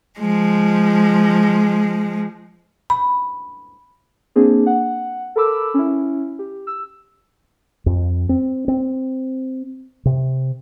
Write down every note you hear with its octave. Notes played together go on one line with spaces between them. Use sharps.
F3 G#3
B5
A#3 C4 D4 G#4
F#5
A4 A#4 B5 D6 E6
C#4 E4
G4
E6
F2
C4
C4
C3